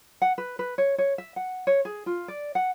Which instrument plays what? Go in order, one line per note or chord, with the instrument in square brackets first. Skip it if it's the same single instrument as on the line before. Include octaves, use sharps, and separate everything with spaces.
[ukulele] F#5
B4
B4
C#5
C#5
E5
F#5
C#5
G#4
F4
D5
F#5